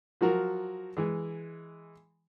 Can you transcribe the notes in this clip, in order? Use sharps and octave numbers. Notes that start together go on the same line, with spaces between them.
F3 F#3 F#4 A#4
E3 G#3